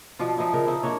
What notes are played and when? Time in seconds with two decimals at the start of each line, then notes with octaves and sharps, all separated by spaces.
0.19 B2 F3 D4 F4
0.38 F3 D#4 E4
0.53 C#3 A#4
0.67 C4 D#4 E4
0.83 A#3 D4 C#5